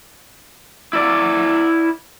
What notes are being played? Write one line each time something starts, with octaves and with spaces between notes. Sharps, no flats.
E4 D5